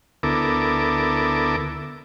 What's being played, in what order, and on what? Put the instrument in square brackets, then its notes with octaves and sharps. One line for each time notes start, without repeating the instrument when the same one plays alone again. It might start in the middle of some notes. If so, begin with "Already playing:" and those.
[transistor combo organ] D2 B3 E4 A4 A#4 D6